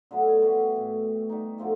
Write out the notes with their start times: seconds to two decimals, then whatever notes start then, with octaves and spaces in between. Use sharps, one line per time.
0.11 D3 F#3 A3 B3
0.28 C#5
0.40 E3 G3 A3 F#4
0.76 A2
1.29 G3 D4 D#4
1.58 B2 D3 F3 A3